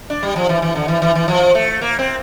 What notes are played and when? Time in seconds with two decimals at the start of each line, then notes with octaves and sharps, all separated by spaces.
0.10 D4
0.23 G3
0.36 F3
0.49 E3
0.62 E3
0.75 D3
0.88 E3
1.02 E3
1.15 E3
1.28 F3
1.55 A3
1.81 A#3
1.99 C4